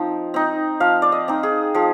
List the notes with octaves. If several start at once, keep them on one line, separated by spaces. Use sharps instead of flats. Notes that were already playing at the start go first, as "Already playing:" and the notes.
Already playing: F3 C4 D#4
C4 D#4
F3 F5
D5
D#5
C4 D#4
G#4
F3 G#4